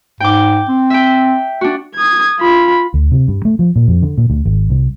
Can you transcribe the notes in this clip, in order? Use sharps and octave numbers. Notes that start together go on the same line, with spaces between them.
G#2 G5 D6
C4
E5 G5
D4 F#4
D#6 G#6
F4 B5
D2
C3
G2
A3
F3
A#2
F2
D3
A#2
D2
G#1
C2